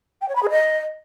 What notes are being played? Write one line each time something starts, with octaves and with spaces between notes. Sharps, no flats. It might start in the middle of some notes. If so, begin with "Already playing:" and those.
G5
C#5
B5
G#4
D#5